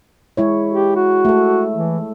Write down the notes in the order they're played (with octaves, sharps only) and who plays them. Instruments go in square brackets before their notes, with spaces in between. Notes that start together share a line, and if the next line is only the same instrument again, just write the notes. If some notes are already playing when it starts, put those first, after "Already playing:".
[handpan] G#3 E4 C#5
[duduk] G4
F#4
[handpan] A3 A4
[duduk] E3